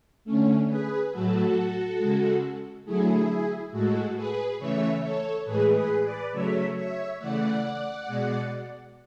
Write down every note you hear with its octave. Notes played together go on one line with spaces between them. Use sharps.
D3 A3 C#4
G#4 B4
A2 F#3 A3 F#4 A4
C#3 G#3
D3 F#3 A3 E4 G#4
A2 G#3 F#4 A4
G#4 B4
C#3 E3 A3 C#5 E5
A4 C#5
A2 E3 G#3 G#4 B4
G#4 B4
B4 D5
C#3 F#3 A3 C#5 E5
C#5 E5
C#3 E3 A3 D5 F#5
B2 G#3